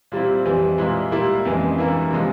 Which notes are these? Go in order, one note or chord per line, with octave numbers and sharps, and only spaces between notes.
A#2 G3 C4 E4
F2 E3 G3
A#2 G#3 E4
A#2 G3 A#3 E4
F2 C#3 E3 G#3
G2 E3 A#3 E4
C3 F3 G#3